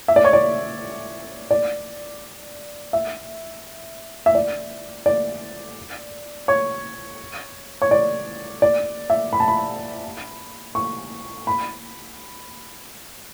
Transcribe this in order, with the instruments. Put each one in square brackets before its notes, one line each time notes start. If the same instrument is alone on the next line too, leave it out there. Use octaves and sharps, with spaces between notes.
[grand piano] E5
D5
C#5
D5
D5
E5
E5
D5
D5
C#5
C#5
D5
D5
E5
B5
A5
B5
C#6
B5